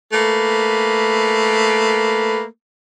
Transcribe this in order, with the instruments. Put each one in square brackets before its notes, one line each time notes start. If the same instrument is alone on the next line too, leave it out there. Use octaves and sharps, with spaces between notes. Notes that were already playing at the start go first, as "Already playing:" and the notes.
[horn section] A3 A#3 B4